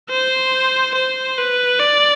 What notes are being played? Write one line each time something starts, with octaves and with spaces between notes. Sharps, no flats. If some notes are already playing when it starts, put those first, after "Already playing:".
C5
C5
B4
D5